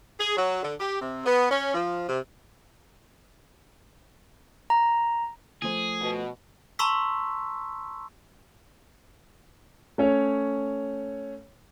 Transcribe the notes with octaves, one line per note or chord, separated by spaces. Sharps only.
G#4
F#3
D3
G4
C3
B3
C#4
F3
C3
A#5
F3 A3 G#4 C5
B2
A5 A#5 C6 C#6 E6 B6
A3 C#4 C#5